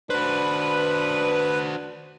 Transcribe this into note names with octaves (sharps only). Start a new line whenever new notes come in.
D4 F#4 B4 C5